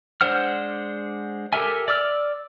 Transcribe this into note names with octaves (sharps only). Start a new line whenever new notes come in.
G#3 D4 C5 F#5 F6
G4 A4 A#4 E5 G#5
D5 D6 E6 F6